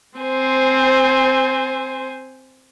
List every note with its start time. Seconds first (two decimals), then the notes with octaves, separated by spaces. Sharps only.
0.19 C4 C5 G#5